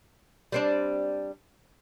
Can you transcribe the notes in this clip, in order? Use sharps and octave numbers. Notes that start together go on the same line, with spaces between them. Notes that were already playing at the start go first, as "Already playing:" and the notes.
G3 C4 D4